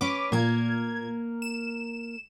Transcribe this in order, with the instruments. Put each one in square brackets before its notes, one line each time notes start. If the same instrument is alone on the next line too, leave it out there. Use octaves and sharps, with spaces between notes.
[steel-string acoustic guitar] C#4 B4 [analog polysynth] D6
[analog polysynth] A#2 G#6 [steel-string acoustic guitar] A#3 A#4
[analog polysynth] E7